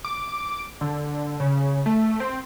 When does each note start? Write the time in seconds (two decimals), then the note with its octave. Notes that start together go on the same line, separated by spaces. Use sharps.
0.05 D6
0.81 D3
1.40 C#3
1.86 A3
2.20 C4